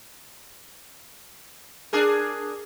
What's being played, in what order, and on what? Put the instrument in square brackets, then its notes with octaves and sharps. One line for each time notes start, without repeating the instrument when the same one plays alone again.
[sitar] D4 G#4 A#4